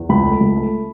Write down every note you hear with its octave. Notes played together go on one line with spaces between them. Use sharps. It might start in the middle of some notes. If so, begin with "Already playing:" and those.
Already playing: E2
C#2 B5
A3
C#2
A3